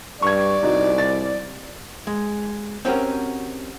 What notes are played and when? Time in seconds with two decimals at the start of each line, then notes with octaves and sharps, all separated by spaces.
0.22 G2 D5 C#6 G#6
0.63 C2 D#4 F#4
0.98 A6
2.07 G#3
2.85 C4 C#4 F#4 G4 A#4